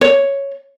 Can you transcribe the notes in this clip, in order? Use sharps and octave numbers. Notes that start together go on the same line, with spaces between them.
C#5